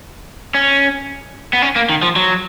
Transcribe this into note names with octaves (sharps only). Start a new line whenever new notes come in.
C#4
B3
C#4
A#3
D#3
F3
F#3